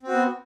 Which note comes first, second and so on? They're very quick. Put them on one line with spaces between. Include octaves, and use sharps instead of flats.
C4 F#4 B3